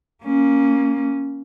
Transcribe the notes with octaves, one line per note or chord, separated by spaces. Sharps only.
A#3 C#4